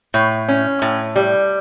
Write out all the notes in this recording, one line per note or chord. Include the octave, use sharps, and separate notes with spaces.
A2
C#4
A2
G3